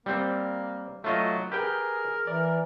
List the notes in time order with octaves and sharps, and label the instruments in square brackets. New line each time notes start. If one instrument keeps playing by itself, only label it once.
[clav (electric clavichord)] G3 C4 C5 [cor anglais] A#3
[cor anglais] F#3 [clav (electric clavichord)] A3 F4 D#5
[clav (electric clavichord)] G4 B4 G5 [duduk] G#4 [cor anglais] A#4
[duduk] E3 [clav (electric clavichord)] D5